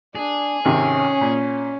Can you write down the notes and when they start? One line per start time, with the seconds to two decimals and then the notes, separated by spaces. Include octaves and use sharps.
0.15 D4 G#4
0.65 G#1 C3 D#3 C#4
1.21 A#2